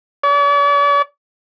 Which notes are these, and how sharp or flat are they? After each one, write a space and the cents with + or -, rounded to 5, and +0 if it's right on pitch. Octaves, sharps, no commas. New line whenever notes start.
D5 -45